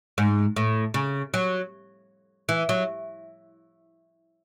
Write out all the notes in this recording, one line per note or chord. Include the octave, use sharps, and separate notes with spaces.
G#2
A2
C#3
F#3
E3
F#3